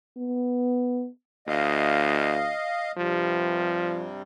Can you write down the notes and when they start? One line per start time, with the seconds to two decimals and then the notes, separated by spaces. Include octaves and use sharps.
0.18 B3
1.47 D2 D#5 F5
2.97 G2 C3 F3 G3